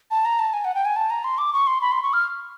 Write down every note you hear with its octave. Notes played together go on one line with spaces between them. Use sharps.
A5
A#5
A5
G#5
F#5
G5
G#5
A5
A#5
C6
D6
C#6
C6
B5
C6
C#6
F6